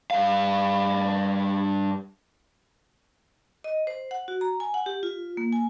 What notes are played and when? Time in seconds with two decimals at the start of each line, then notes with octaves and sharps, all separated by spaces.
0.11 G2 F5
3.64 D#5
3.87 C5
4.11 F#5
4.28 F#4
4.41 A#5
4.60 G#5
4.74 F#5
4.86 G4
5.03 F4
5.37 A#3
5.53 G#5